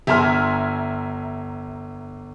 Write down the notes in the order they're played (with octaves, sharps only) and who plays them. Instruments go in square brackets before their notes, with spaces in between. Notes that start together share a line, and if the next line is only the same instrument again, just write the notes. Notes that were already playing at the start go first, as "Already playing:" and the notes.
[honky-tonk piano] G1 E5 G#5 A#5 C6 F6